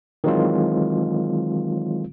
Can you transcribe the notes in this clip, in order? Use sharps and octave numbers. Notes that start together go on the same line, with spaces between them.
D#3 E3 F#3 G#3 C4 F4